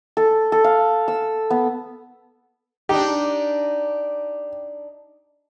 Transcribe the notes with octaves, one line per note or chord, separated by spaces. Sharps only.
A4
A4
F5
E6
B3
D4 D#4 G4